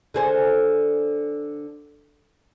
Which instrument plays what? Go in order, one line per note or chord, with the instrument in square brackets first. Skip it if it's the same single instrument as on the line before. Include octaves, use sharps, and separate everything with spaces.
[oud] D3 G#4 C5